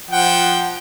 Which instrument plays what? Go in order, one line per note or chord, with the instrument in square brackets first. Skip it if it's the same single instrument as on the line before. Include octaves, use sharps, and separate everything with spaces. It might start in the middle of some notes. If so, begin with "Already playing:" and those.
[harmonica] F3 G5 [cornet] F#5